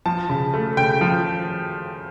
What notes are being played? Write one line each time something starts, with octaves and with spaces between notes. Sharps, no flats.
F3 A5
C#3
A3
C#3 G5
F3